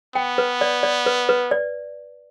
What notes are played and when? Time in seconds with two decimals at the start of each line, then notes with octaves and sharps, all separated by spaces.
0.15 B3 G5
0.38 B4
0.61 D5
0.83 D5
1.06 B4
1.29 B4
1.51 D5